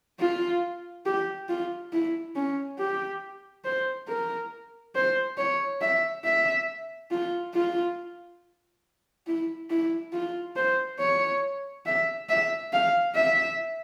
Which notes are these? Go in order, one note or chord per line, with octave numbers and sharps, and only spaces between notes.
F4
G4
F4
E4
C#4
G4
C5
A#4
C5
C#5
E5
E5
F4
F4
E4
E4
F4
C5
C#5
E5
E5
F5
E5